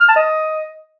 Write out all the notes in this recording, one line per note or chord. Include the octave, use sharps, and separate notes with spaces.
F6
A5
D#5